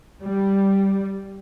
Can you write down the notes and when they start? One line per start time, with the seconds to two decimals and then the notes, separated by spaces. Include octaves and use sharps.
0.24 G3